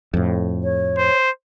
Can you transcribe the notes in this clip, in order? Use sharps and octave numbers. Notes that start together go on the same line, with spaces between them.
F2 A2
C#5
C5